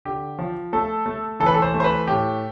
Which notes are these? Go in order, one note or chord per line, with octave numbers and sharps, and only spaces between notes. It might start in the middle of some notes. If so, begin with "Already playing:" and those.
D3 G4
F3
A3 A4
A3
E3 A4
B4
A4
C5
A3
C5
B4
A2 G4